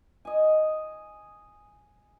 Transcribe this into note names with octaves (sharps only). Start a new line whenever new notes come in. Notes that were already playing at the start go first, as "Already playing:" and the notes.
D#5 G#5